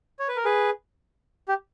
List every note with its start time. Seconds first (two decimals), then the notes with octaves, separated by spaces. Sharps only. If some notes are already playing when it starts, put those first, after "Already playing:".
0.19 C#5
0.28 B4
0.36 A#4
0.45 G#4 B4
1.48 G4